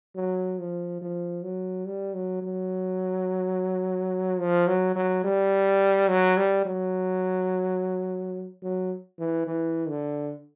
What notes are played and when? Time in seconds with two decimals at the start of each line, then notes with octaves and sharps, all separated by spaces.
0.16 F#3
0.59 F3
1.02 F3
1.43 F#3
1.86 G3
2.14 F#3
2.42 F#3
4.40 F3
4.68 F#3
4.95 F#3
5.24 G3
6.09 F#3
6.37 G3
6.66 F#3
8.63 F#3
9.19 E3
9.47 E3
9.89 D3